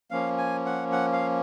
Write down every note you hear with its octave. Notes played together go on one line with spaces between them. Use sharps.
F3 A#3 C#4 F5
G#5
F#5
F#5
F5